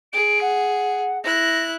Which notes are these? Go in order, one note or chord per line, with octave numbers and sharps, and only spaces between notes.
G#4 D7
F#5
E4 F#6 A#6